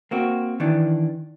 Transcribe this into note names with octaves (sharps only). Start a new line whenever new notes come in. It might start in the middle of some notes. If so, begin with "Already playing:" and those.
A#3 C4 F#4
D#3 E3 D4